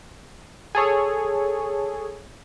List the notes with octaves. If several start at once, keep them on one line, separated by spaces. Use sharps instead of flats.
G#4 A4 C#5